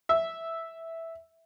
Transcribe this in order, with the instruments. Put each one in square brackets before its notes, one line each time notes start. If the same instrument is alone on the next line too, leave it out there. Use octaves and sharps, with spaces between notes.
[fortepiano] E5